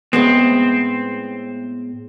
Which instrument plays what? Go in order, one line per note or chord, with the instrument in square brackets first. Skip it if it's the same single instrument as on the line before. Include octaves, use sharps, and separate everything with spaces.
[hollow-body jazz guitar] A2 G#3 B3 [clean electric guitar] C4